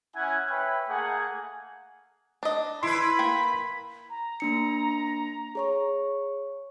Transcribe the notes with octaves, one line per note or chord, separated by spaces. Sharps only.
C#4 E4 F#5 G#5
B4 C#5 E5 G5 B5
A3 A#3 G#4 F#5 G#5
D4 D#5
E4 B4 B5 C6
A#3 G5
A#5
A#3 D4 C#7
G#4 C#5 C#6